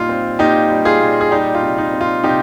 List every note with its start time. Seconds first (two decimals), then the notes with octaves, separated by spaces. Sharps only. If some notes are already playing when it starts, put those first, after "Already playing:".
Already playing: A#2 G3 D#4 F4
0.09 C4
0.39 A#2 D#4 G4
0.70 G3
0.85 F4 G#4
1.01 A#2
1.21 G#4
1.31 G3 D#4 G4
1.55 F4
1.63 C3
1.78 D#4
1.93 C4
2.01 F4
2.24 C3 D#4 G4